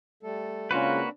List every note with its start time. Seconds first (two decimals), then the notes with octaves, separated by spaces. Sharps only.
0.23 G3 A3 A4
0.71 C#3 G#3 A#3 C4 D4 F4 F#4 B4